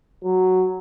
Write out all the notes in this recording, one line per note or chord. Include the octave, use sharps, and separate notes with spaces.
F#3